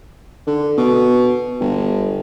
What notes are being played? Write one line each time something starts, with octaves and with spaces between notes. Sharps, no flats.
D3
B2
G1